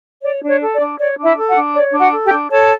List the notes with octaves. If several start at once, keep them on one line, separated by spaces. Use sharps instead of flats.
C#5 D5
D4
C#5
A4
D5
D4
C#5 D5
D4
E4 E5
A4
F#4 F#5
D4
C#5 D5
D4
F#4 F#5
A4
G4 G5
D4
A4 C#5 A5